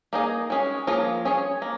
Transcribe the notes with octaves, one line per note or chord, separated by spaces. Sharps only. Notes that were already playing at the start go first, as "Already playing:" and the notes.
A#3 D#4 G#4 D#5
G#3 C#4 G#4
F3 A#3 F4 G#4 C#5
C#4 G#4 C#5
A#3